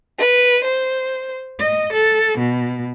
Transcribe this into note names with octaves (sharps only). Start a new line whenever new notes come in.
B4
C5
D#5
A4
B2